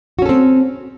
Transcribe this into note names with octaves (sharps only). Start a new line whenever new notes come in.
C4 C#4 F#4 A4